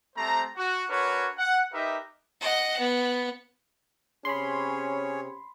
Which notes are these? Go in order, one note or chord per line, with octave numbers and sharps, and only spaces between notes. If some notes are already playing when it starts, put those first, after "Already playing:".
G3 A3 C4 C5 A#5
F#4
D4 F#4 A#4 B4 C#5
F#5
D#4 G4 A#4 B4 D#5 E5
D#5 F#5
B3
C3 C#4 G#4 C#5 B5 C6